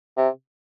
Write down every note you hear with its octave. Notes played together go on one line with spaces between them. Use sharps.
C3